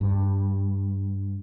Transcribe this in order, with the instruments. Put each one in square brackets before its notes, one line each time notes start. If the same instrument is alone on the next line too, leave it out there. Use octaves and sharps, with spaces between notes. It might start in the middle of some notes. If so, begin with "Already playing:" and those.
[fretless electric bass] G2